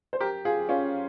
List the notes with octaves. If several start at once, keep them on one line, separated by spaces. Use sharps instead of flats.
C5
G4 A#4
F4 G#4
C#4 F4